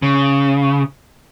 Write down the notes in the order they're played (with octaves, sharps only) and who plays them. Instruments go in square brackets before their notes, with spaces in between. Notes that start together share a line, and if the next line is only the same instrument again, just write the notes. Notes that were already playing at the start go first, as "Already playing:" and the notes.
[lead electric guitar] C#3